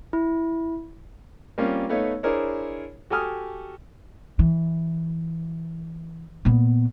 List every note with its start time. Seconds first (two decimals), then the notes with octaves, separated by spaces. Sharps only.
0.13 E4
1.58 G3 A#3 C4 C#4 F4
1.89 A3 B3 D#4 C#5 F5
2.23 D4 E4 G#4 A#4 C5 C#5
3.10 F#4 G4 A4 G#5 D#6 F6
4.39 E3
6.45 A#2 B3